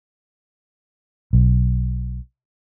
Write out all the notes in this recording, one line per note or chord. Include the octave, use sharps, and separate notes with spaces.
B1